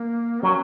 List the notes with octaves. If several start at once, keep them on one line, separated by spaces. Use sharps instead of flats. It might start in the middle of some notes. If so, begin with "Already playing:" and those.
Already playing: A#3
F#3 C#4